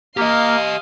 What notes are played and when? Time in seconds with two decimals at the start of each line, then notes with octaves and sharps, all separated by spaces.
0.17 A#3 G4 D#5 F5 C6 D#6